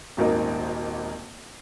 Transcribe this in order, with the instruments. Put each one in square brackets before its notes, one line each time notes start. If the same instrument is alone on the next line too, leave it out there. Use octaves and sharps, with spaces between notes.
[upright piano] D#1 G#1 A#3 D#4